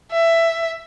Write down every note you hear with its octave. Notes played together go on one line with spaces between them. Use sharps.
E5